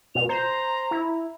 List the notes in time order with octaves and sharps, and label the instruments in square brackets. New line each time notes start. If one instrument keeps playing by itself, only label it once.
[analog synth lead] B2 [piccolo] F7
[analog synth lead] C5 [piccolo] A#5
[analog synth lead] E4